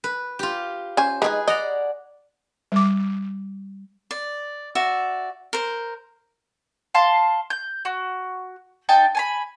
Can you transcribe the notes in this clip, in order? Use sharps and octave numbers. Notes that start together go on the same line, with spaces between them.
B4
F4 G4
C#4 C5 G#5
G#3 D4 D#4 G#4 B4
D5 D#5 F#5 A#5
G3 D6
D5
F#4 D5 E5
A#4 C5
F5 A5 C6
G6
F#4
D#4 G5 A5
G#5 A5 B5